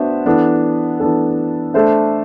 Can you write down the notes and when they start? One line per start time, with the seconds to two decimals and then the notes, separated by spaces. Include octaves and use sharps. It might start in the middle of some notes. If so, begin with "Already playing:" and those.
Already playing: B3 D4 F#4 C5 E5
0.26 E3 B3 D4 A4
1.00 E3 B3 D4 A4
1.74 A3 D4 A4 C5 E5